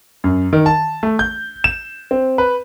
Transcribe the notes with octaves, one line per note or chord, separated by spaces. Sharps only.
F#2
D#3
A5
A3
G6
E7
C4
B4